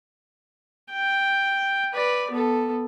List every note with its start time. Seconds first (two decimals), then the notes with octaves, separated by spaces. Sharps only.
0.92 G5
1.94 B4 D5
2.31 B3 A4